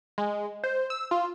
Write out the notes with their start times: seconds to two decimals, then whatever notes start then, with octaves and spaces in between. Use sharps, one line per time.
0.18 G#3
0.64 C5
0.90 E6
1.11 F4